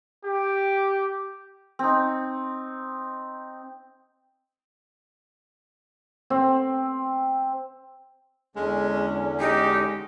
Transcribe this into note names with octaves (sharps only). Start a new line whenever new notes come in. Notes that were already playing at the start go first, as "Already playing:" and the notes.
G4
C4 D#4
C4
E2 D3 G#3 C#4
G#3 D#4 G4